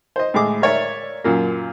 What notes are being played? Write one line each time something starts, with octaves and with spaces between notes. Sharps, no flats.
C5 D#5
A2 G#3 G#4 D6
A#4 C#5 D5 E5
F#2 A#2 A#3